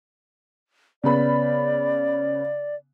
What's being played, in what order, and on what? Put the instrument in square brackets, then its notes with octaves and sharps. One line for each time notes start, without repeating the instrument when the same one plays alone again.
[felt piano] C#3 B3 B5 [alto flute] D5